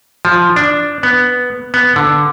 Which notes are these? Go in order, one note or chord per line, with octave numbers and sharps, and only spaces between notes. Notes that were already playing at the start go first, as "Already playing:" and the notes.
F3
D4
B3
B3
D3